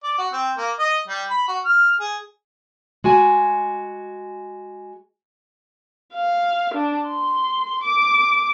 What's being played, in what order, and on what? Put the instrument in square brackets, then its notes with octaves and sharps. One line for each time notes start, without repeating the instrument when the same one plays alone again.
[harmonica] D5
F#4
C4
A#3
D#5
G3
B5
F#4
F6
G#4
[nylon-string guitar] G#3 F#4 G#5
[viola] F5
D4
C6
D6